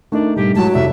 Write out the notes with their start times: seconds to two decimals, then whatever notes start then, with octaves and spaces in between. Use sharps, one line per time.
0.12 A3 D4 D#4 A#4
0.36 G#2 B2 G3 G4
0.56 G#2 F#3 G#3 E4 A5
0.74 F1 A2 D5 E5